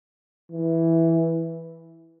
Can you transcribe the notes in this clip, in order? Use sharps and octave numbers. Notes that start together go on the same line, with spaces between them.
E3